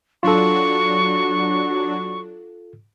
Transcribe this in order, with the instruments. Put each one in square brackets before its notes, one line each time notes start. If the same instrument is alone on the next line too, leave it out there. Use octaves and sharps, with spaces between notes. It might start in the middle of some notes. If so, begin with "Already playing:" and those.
[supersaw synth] F#3 D4 F#4 [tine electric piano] F4 A4 [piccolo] C#6